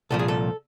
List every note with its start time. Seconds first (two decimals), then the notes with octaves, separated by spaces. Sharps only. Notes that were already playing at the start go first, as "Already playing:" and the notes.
0.10 C2 A#2 F3 A4
0.19 G#4
0.28 A4